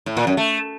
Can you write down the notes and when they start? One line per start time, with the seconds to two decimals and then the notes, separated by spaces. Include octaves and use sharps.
0.06 A2
0.17 A#2
0.27 F#2
0.37 A3